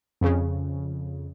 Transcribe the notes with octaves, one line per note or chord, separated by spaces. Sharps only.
F2 C#3